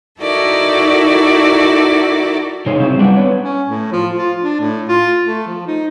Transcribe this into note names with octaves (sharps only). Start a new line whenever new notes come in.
D#4 E4 F#4 A4 A#4 D5
C3 D#4 G#4 C5 C#5
C#3 F#3 C4 E4
G3 B3 D4 D5 E5 F#5
B3 C#5
C#4
A2
F3
F4
D4
A2
F4
A3
F3
D#4